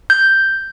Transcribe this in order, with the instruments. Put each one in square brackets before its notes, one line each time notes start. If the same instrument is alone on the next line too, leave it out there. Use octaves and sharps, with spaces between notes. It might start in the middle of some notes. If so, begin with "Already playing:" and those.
[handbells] G6